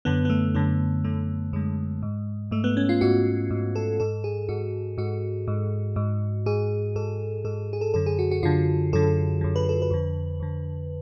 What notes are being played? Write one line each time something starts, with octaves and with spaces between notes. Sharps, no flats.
F#2 D3 B3
B3
A3
F#2 D3 B3
F#2 D3 A3
F#2 D3 G#3
G#2
G#2 A3
B3
C#4
F4
G#2 F#4
G#2
A4
G#2 A4
G#4
G#2 F#4
G#2 F#4
G#2
G#2
G#2 G#4
G#2 A4
G#2 A4
G#4
A4
F#2 D3 A4
G#4
F#4
F#4
F#2 D3 F4
F#2 D3 A4
F#2 D3
B4
A4
B4
F2 D3
F2 D3